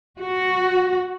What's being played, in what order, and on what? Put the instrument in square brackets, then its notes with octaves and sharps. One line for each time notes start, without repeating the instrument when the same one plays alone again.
[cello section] F#4